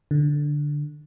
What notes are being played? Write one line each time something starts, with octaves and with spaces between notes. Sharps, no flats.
D3